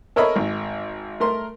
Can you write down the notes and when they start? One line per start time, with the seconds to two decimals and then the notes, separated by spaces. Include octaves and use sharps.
0.16 A4 A#4 C#5 D#5 E5 B5
0.36 G#1
1.20 A3 A#4 C6